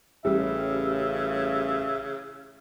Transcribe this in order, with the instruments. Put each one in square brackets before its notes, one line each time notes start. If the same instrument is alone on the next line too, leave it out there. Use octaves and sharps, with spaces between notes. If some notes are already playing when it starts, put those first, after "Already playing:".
[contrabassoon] A1 [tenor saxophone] C#3 [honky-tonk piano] G3 [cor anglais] E5